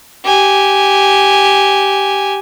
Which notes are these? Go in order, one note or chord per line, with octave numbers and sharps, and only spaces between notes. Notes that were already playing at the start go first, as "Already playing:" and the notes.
G4 G#5